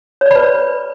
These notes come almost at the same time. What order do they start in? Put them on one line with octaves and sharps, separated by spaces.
C#5 D5 B5 B4